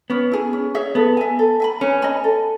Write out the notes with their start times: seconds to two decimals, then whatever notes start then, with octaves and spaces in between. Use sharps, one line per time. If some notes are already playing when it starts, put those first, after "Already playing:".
0.10 B3 C#4
0.32 E4 G#4
0.53 C#4
0.74 G#4 C#5 E5
0.95 B3 A4
1.17 E5 G#5
1.39 A4
1.60 E5 G#5 B5
1.81 C#4 B4
2.02 D#5 G#5 B5
2.24 A4